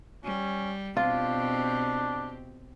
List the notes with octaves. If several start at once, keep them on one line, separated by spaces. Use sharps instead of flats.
G3 C#4
B2 C4 D4 F4 G4